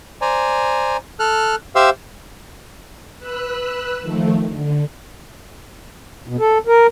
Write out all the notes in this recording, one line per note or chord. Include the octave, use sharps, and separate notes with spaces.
C5 D5 G#5 A#5
A4 F6 F#6
G4 C5 E5 F5 E6
B4 E6 F#6
D#3 F3 A3
D3
B2
A4
A#4